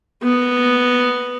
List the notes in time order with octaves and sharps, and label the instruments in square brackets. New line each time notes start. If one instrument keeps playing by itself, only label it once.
[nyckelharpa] B3